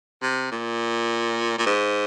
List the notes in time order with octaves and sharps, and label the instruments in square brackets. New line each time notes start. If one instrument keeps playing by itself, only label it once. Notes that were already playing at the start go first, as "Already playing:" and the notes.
[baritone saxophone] C3
A#2
A#2
G#2